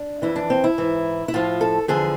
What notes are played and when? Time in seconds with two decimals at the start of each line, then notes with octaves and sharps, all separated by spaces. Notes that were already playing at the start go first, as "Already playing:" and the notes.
Already playing: D4
0.22 F2 E3 E4
0.36 D4
0.50 C4
0.64 E4
0.78 G#2 E3
1.28 E4
1.34 A2 F3 F4
1.61 A4
1.88 E2 D3 F3 G#4